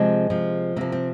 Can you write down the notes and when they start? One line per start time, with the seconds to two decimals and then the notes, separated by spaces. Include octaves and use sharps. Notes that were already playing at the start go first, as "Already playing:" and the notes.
Already playing: C3 F3 G#3
0.30 C3 F3
0.76 C3 F3 A#3
0.92 C4